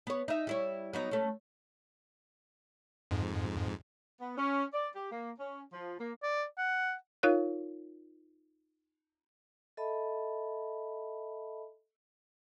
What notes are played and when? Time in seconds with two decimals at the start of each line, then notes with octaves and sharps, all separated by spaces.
0.07 B3 C#5
0.28 D#4 E5
0.47 G3 E4 C#5
0.93 F#3 B3 D#4
1.11 A3 C#4
3.11 F2 G#2
4.20 B3
4.37 C#4
4.73 D5
4.95 G4
5.11 A#3
5.38 C#4
5.72 F3
5.99 A#3
6.23 D5
6.58 F#5
7.23 D#4 F4 A#4 C#5 F5 F#6
9.77 A4 D#5 E5 A5 B5